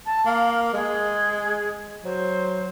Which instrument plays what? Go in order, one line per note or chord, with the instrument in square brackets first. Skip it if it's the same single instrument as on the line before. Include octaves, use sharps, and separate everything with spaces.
[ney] A5
[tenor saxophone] A#3 [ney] F5
[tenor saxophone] G#3 [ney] G#4
[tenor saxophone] F#3 [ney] C5